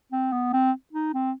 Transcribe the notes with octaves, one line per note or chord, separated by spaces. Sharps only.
C4
B3
C4
D#4
C4